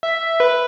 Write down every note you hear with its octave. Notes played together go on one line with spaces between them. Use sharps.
E5
B4